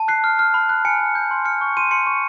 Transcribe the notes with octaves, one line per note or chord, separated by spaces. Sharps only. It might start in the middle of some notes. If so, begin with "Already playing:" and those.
Already playing: A5
F#6 C7
F6
F6
B5
F#6
G#5 C#7
G#5
G6
C6
F6 C#7
C#6
C6 D#7
C6 C#7
C#6